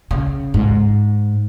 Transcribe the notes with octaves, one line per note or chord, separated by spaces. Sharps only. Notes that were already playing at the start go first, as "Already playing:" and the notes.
C#3
G#2